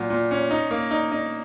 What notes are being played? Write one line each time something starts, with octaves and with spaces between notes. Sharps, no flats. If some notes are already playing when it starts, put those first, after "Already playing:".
Already playing: A#2 F#3
A#2
C#4
D#4
A#3
D#4
D#4